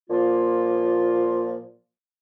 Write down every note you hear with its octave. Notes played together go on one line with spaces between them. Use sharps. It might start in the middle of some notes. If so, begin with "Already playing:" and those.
A#2 F3 A#3 F4